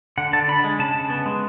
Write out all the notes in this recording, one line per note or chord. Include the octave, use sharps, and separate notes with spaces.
D3 F#5
D3 A5
D4 B5
G#3
C#3 A5
C#3
B3
G#3